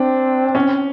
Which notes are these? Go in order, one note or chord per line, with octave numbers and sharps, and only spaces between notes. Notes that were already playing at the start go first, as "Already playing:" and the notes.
Already playing: C4 D4
C#4